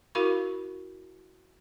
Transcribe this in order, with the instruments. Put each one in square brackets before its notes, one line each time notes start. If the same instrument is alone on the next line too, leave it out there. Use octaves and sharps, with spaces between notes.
[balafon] E4 F#4 A#4 F5 B5 C#6